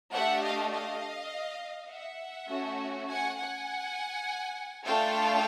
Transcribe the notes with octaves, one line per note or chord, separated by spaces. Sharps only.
A3 D4 G4 E5 F#5
D#5 F5
D#5 F5
E5 F#5
A3 C#4 F#4
F#5 G#5
F#5 G#5
A3 D4 F4 A4 F5 G5